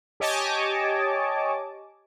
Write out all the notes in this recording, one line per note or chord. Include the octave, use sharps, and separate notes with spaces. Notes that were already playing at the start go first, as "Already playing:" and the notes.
G4 C#5 D#5 G#5 A5 D6